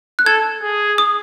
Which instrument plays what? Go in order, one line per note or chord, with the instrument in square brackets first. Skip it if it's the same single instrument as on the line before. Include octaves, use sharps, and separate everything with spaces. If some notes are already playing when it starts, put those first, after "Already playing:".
[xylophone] F#6
[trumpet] A4 [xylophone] G#6
[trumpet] G#4
[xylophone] D#6